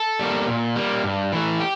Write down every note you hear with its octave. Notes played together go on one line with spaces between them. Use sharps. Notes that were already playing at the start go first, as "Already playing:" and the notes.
Already playing: A4
G3 A#3
A#2
G3 A#3
G2
E3 A3
G4